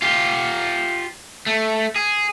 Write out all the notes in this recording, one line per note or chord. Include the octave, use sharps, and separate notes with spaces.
F4 G4
A3
G#4